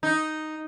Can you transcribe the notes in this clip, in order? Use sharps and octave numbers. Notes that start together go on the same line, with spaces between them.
D#4